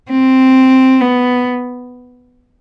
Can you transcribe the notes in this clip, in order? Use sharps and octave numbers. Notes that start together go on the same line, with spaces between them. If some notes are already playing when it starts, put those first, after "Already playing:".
C4
B3